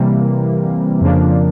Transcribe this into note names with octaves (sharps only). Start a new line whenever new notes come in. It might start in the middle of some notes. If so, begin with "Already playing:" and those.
Already playing: C3 E3 G3 A#3
F2 C#3 F3 A#3 D4